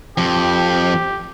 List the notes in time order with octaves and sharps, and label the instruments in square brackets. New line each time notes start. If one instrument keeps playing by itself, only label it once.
[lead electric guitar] F2 [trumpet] G4